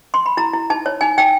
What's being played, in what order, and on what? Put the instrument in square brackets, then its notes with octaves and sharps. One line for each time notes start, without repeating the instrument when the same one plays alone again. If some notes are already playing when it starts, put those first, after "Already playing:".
[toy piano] C6
B5
E4 A#5
E4
D#4 A5
C#5
D#4 G#5
D#4 G5